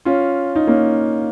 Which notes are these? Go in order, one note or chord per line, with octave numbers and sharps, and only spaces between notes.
C#4 F4
D#4
A#3 C#4